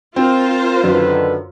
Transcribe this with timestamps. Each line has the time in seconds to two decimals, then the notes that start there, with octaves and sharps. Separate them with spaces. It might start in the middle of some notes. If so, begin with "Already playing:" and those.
0.16 C4 F4 A#4 C5
0.83 F#2 D3 D#3 B4